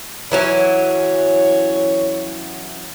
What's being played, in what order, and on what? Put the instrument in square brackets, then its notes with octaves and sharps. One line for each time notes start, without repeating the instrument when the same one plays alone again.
[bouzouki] E3 F#3 C#4 [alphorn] C#5